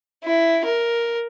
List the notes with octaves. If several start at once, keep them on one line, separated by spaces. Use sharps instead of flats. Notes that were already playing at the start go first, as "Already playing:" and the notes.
E4
A#4